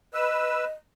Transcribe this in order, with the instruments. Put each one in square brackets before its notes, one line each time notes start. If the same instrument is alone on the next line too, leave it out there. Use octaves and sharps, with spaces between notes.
[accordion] B4 E6 [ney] D#5